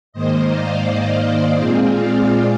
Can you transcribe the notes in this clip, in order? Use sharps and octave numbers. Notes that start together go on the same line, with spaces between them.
G#2 D#3 A#3 C5 D#5
D5 F5
A#2 G#3 C4 F4 G#4
D5 F5